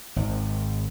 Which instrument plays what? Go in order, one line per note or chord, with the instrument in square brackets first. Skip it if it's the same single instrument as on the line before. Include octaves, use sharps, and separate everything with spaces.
[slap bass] G#1